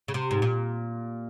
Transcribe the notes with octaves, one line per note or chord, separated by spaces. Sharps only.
C#3
C3
G#2
A#2